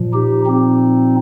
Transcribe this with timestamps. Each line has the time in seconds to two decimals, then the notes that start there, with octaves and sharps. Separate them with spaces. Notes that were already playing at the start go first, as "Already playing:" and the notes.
Already playing: A#2 F3
0.14 D#4 G4
0.46 C4 D#4